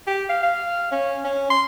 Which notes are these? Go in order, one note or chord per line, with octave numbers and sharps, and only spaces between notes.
G4
F5
F5
C#4
C#4
C6